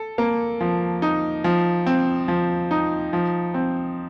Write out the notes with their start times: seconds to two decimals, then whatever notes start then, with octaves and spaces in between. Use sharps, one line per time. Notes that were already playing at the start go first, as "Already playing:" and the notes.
Already playing: A4
0.18 A#3
0.61 F3
1.02 D#4
1.44 F3
1.86 C4
2.28 F3
2.71 D#4
3.13 F3
3.54 C4